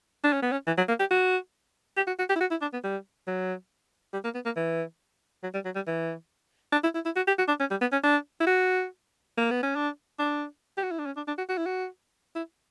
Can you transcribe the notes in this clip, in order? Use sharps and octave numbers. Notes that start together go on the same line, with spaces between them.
D4
C#4
B3
C#4
E3
F#3
A#3
G4
F#4
G4
F#4
F#4
G4
E4
F#4
E4
D4
B3
G3
F#3
G3
A#3
B3
A#3
E3
F#3
G3
F#3
G3
E3
D4
E4
E4
E4
F#4
G4
F#4
D4
C#4
G3
B3
C#4
D4
E4
F#4
A#3
B3
C#4
D4
D4
G4
F#4
E4
D4
C#4
D4
D4
F#4
F#4
E4
F#4
E4